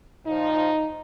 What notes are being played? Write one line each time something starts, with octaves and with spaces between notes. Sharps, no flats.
A#2 F3 D#4